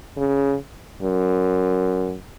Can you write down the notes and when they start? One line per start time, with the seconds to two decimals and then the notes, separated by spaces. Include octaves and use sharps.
0.17 C#3
1.02 F#2